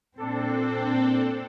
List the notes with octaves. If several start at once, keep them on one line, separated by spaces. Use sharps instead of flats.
A#2 C4 D4 A4